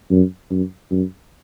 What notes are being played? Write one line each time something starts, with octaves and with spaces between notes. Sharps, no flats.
F#2
F#2
F#2